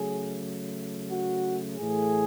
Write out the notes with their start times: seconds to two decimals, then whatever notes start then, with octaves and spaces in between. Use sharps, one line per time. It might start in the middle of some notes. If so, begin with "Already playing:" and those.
Already playing: C#3 F#3 A3 G#4
1.10 F#4
1.78 A2 E3 A3 G#4